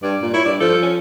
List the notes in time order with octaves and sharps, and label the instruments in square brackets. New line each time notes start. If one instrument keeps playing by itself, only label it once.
[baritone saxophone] G2 [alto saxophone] D5
[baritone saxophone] A#2
[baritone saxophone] E4 [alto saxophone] C#5
[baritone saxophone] G2 [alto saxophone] D5
[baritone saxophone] F3 [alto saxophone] A4
[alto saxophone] C#4